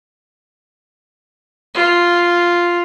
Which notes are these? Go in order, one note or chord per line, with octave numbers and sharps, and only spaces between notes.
F4